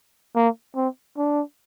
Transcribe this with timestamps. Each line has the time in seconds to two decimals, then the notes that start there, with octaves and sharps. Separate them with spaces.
0.36 A#3
0.76 C4
1.18 D4